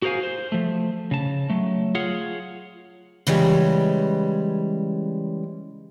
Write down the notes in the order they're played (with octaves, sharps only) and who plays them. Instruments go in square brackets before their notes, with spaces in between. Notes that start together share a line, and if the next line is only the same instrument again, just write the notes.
[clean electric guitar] F#4 G#4 A#4 C5 F5 G#5
C5
F3 A3
C#3 A5
F#3 A3
F4 G#4 C#5 F#5
[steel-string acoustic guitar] C#3 E3 G3 G#3